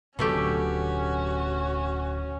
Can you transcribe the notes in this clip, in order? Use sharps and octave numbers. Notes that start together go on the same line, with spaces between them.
D1 B2 D3 F#3 A3 C#4 F#4 G4